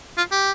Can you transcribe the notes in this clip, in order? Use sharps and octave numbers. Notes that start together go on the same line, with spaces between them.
F4
G4